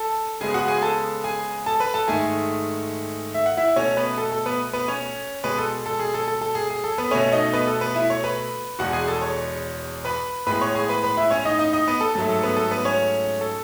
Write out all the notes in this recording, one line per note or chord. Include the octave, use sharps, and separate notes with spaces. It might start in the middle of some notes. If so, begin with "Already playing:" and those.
Already playing: A4 A5
C#3 G#3 B3 G#4 G#5
F#4 F#5
G#4 G#5
A4 A5
G#4 G#5
A4 A5
B4 B5
A4 A5
G#2 D#3 A3 G#4 G#5
E5
F#5
E4 E5
B2 A3 C#4 C#5
B3 B4
A4
A4
B3 B4
B3 B4
C#4 C#5
B2 G#3 B3 B4
A4
A4
G#4
A4
A4
A4
G#4
G#4
A4
B3 B4
B2 A3 C#4 C#5
D#4 D#5
B3 B4
A4
B3 B4
E4 E5
C#5 C#6
B4 B5
E2 B2 G#3 B3 F#4 F#5
G#4 G#5
A4 A5
C#5 C#6
B4 B5
A2 G#3 B3 B4 B5
C#5 C#6
G#4 G#5
B4 B5
B4 B5
E4 E5
C#4 C#5
D#4 D#5
D#4 D#5
D#4 D#5
B3 B4
A4
G#2 F#3 A3 A4
A4
B3 B4
A4
B3 B4
C#4 C#5
A4